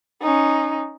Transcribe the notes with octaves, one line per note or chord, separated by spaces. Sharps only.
C#4 D#4